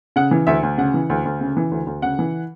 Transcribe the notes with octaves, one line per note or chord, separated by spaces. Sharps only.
C#3 F#5
E3
D2 E5
D2
C#3 F#5
E3
D2
D2
C#3
E3
D2
D2
C#3 F#5
E3